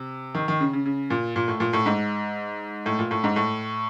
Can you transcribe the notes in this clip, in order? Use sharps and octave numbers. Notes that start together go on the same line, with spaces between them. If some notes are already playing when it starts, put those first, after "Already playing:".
Already playing: C3
D#3
D#3
C#3
C#3
C#3
A#2
A#2
A2
A#2
A2
G#2
A2
A#2
A2
G#2
A2